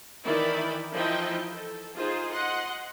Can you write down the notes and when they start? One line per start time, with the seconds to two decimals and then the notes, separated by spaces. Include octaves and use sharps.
0.24 D#3 E3 E4 D5 G5 B5
0.93 E3 F3 D#4 E4 D#5 G5
1.50 A4
1.96 D#4 F4 G#4 C5
2.32 D#5 F#5 C6